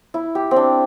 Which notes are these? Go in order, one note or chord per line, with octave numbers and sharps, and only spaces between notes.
E4
G4
C4
D4